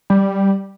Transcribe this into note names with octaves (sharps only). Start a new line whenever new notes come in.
G3